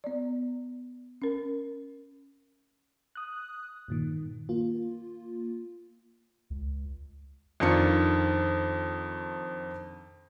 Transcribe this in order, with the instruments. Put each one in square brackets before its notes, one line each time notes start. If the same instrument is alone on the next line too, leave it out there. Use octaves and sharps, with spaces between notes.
[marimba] B3 D5
C#4 A#4
[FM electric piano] D#6 F#6
G2 A#2 D#3
A#3 F4
[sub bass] C#2
[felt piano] F2 D#3 D4 F4 C#7